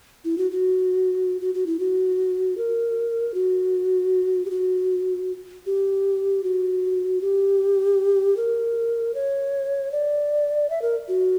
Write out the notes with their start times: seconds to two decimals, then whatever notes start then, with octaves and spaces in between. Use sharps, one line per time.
0.25 E4
0.38 F#4
0.51 F#4
1.41 F#4
1.54 F#4
1.66 E4
1.79 F#4
2.58 A#4
3.34 F#4
4.45 G4
4.50 F#4
5.66 G4
6.44 F#4
7.21 G4
8.37 A#4
9.15 C#5
9.92 D5
10.70 E5
10.82 A#4
11.08 F#4